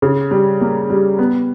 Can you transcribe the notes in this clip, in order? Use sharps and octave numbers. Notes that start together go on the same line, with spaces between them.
C#3
G3
A#3
G3
B3